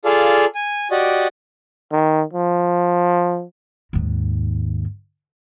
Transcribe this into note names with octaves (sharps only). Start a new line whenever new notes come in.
F4 G#4 A4 D5 F5
G#5
F#4 G4 D5 D#5
D#3
F3
D#2 G#2